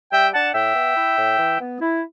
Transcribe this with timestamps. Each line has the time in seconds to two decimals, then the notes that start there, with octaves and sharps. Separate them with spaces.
0.12 G3 E5 G5
0.33 D4 F#5 A5
0.54 A2 E5 G5
0.75 B3
0.96 E4
1.17 A2
1.39 E3
1.60 B3
1.80 E4